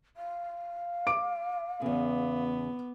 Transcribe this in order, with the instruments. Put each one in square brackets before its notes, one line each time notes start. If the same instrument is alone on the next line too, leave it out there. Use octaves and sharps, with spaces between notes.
[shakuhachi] F5
[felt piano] D6 D7
[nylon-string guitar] E2 C#3 [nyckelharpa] B3